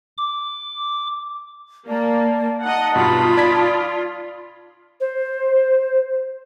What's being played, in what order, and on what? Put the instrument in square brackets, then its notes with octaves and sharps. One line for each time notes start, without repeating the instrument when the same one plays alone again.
[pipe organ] D6
[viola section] A#3 [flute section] D5 A5
[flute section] D#4 A5 D#6 [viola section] D#5 F#5
[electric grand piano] G2 B2 [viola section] F4 [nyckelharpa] B5
[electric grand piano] D5 G#6 B6
[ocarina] C5